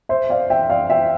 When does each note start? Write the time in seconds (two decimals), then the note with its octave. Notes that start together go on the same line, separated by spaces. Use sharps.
0.09 C5 E5
0.29 D5 F5
0.50 E5 G5
0.70 D5 F5
0.90 E5 G5